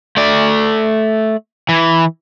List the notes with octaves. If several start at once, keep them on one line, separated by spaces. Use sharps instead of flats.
A3 D5
E3